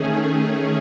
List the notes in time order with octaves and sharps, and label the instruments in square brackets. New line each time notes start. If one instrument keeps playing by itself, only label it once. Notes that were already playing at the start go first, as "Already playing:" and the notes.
Already playing: [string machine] D#3 A3 C#4 G#4